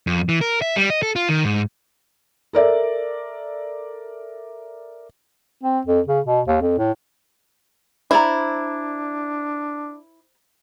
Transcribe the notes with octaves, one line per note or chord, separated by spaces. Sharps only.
F2
E3
A#4
E5
G3
D#5
A4
F4
D#3
G#2
A4 A#4 D5 E5
C4
F2
C#3
B2
D#2
F2
A2
D4 E4 C5 D5 A#5